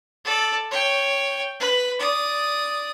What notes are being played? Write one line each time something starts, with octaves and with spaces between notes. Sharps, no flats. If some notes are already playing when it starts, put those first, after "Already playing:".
A4 D5
C#5 G5
B4
D5 D#6